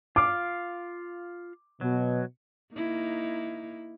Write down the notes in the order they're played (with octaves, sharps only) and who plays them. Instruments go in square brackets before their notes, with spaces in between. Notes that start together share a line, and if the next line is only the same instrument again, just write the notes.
[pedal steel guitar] F4 F5 [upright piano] D6
[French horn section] B2 [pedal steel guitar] F#3
[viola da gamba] A#3 D#4 E4